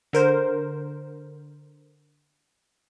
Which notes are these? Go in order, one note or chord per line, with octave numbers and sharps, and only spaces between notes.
D3 A#4 C5